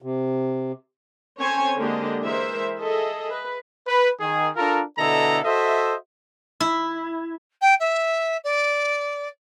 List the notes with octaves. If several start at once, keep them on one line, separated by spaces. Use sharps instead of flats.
C3
C4 C#4 A4 C5 C#5 G#5
D3 G#3 A#3 D4 G4 D#5
E3 G#3 A#4 C5 E5
G#4 A4 D#5 E5
B4
B4
D#3 G#4
D4 F4 A4 A#4
B2 D3 E4 A4 D#5 A#5
F#4 A4 C5 D#5 E5
E4
G5
E5
D5